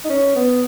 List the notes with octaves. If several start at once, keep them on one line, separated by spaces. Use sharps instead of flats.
D#4
C#4
B3